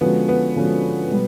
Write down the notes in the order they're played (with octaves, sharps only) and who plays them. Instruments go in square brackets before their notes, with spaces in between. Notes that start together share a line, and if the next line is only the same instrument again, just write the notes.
[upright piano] D3 F3 G#3 C#4 F#4 [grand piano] B3
[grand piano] B3
[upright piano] D3 F3 G#3 C#4 F#4
B2 G3